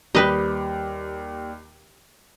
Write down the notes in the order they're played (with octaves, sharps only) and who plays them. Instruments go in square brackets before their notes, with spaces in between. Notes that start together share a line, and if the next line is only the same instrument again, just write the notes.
[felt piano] D#2 G3 [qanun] G4 [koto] B4 D#5